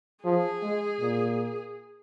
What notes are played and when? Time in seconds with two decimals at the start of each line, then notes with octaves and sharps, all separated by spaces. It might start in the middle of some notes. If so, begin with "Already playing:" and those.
0.25 F3 G#4
0.63 G#3
1.00 A#2